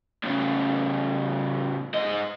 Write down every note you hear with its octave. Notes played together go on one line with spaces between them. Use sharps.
A2 C#3
G#2 D#5